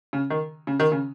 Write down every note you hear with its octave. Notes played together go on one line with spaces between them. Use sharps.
C#3
D#3
C#3
D#3
C#3